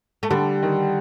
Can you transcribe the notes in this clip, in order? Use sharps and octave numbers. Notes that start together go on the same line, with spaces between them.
A3
D3 G3
D#3